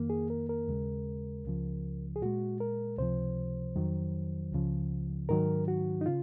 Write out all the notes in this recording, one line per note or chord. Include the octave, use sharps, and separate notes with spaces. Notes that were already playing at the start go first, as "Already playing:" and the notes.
Already playing: F2 D#3 A#3
G#4
A#4
A#4
D#2 C#3 G#3
C#2 C#3 F3
G#4
A#2 G#3 F#4
A#4
C#2 C3 F3 C5
F2 D#3 F#3
C#2 C#3 F3
G#2 D#3 F#3 A#4
F#4
D#4
C#3 F4